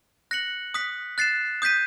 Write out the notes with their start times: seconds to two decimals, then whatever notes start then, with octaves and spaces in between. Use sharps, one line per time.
0.31 F#6 A#6 C#7 F#7
0.74 D#6 F#6 B6
1.18 F#6 A6 C7 E7
1.62 D#6 G6 B6 D#7